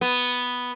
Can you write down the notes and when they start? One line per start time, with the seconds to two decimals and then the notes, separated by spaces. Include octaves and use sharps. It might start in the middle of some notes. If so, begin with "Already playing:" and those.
0.01 B3